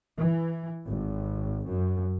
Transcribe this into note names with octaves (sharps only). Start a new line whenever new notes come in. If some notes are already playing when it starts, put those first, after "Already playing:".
E3
G#1
F#2